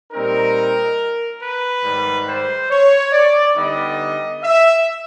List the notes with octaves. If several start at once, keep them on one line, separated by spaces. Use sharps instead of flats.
A#2 G3 C4 D#4 A#4
B4
G#2 D#3 G3
C5
C#5
D5
D3 G3 B3 D#4 D#5
E5